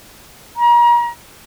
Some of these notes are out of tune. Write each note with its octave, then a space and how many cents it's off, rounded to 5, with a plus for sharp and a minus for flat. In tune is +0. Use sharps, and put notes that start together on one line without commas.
A#5 +35